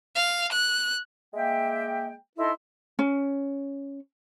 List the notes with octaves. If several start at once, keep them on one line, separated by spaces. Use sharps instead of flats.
F5
F#6
G#3 A#3 E5 G5
D#4 E4 A4 D#5 C6
C#4